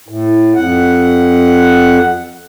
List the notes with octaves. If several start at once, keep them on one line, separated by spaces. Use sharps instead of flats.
A2
F2 F#5